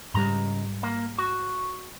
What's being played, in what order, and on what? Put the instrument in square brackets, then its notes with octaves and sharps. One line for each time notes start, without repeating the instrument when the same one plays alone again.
[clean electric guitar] C#2 A#5 [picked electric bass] G#2 G3
[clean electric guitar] A#3
F#4